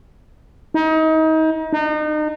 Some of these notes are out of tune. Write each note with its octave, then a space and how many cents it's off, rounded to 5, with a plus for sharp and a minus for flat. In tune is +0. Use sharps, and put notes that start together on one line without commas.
D#4 +30
D#4 -35